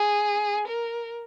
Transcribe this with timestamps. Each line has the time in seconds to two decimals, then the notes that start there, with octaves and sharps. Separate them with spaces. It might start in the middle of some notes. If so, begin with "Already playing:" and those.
Already playing: G#4
0.67 A#4